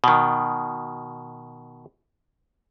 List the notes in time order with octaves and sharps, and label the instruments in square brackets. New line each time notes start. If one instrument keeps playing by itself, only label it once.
[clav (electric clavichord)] B2 D#3